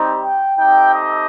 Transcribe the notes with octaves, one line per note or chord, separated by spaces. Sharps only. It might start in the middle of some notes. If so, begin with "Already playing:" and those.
Already playing: G3 C4 D#4 G4
G5
A3 C4 D#4 G4 G5
D#5